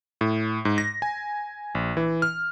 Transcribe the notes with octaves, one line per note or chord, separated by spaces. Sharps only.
A2
G#2
A#6
G#5
A#1
E3
F6